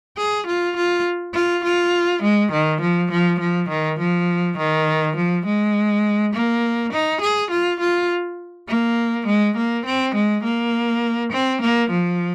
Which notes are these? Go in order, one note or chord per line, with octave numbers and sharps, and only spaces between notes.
G#4
F4
F4
F4
F4
G#3
D#3
F3
F3
F3
D#3
F3
D#3
F3
G#3
A#3
D#4
G#4
F4
F4
A#3
G#3
A#3
C4
G#3
A#3
C4
A#3
F3